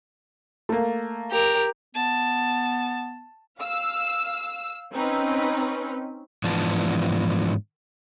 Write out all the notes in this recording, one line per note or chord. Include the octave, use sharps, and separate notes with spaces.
A3 A#3
G4 A#4
B3 A5
F5 E6
C4 C#4 D#4 B4
G#2 E3 F3 B3 D4 A5